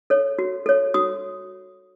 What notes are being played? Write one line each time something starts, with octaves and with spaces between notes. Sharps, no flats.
A4 C#5
F#4
A4 C#5
F#4 D#6